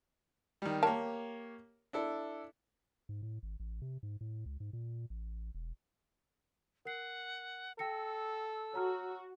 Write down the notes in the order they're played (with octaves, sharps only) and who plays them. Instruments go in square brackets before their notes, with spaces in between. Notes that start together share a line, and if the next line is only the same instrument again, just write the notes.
[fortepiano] D#3 G3
[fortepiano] A#3 G4 C#5 [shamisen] A#4 F5 A5
[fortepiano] D4 E4 A4
[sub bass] G#2
A2
G#1
A1
C3
G#2
A2
C#2
G#2
A#2
A1
E1
[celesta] A#4 C7 [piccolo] F#5
[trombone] A4 [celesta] G5 A#6 C#7 [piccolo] E6
[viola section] F#4 [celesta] C#5 A#5 F6